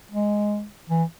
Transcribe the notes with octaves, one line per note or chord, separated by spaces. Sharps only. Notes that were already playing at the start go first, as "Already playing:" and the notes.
G#3
E3